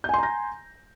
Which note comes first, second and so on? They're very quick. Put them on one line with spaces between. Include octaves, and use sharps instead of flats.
G6 G#5 C6 A#5 A#6